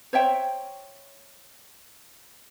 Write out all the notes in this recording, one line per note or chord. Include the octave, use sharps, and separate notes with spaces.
C5 C#5 E5 G5